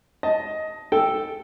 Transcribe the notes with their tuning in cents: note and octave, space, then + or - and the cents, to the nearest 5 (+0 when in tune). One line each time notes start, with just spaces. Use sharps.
D#5 +15 A5 +0
A4 +0 G5 +0